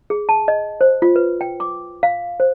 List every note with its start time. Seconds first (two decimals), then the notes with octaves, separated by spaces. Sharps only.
0.10 G#4
0.29 A5
0.48 D#5
0.81 C5
1.02 F4
1.16 B4
1.41 G5
1.60 D6
2.03 F5
2.40 C5